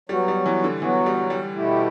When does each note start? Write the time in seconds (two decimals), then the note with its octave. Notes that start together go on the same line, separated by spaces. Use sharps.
0.09 F#3 G3 B3 F#4
0.28 G3
0.46 E3
0.64 D3
0.82 E3 F#3 B3 F#4
1.06 G3
1.30 G3
1.55 B2 A3 E4 G4